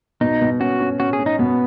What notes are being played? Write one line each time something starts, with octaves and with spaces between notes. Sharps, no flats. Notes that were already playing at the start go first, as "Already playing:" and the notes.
B2 D#4
B2
C#4 F#4
C#4
C#4 F#4
G#4
C#4
D#4
B2 B3